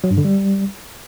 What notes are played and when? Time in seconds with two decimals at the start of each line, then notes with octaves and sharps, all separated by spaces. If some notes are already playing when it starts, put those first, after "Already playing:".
0.04 F#3
0.11 G2
0.18 D3
0.25 G3